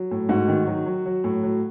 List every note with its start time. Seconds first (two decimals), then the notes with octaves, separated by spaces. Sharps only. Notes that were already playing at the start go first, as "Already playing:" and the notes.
Already playing: F#3
0.11 A2
0.29 G#2 F#4
0.48 D#3
0.67 F#3
0.86 F#3
1.06 F#3
1.24 A2
1.43 F#3